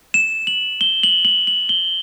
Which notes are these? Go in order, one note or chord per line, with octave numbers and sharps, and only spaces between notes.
E7
F#7
G7
F#7
F#7
F#7
G7